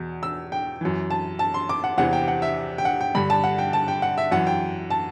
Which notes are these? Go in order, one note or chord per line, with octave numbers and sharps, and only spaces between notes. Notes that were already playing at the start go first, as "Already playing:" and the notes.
Already playing: E2 B2
E6
G5
F#2 E3
A5
A5
C6
D6
F#5
E2 C3 E3 F#5
G5
F#5
E5
G5
F#5
G5
G2 D3 B5
A5
F#5
G5
A5
G5
F#5
E5
F#2 E3 F#5
G5
A5